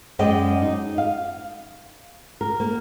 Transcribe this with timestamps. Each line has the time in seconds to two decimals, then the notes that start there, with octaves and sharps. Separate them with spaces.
0.19 F#2 G#3 D5 D#5 G5
0.62 D#4
0.98 F5
2.41 A#4
2.60 A#3